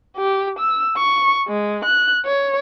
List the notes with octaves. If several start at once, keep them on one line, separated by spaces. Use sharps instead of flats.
G4
E6
C#6
G#3
F#6
C#5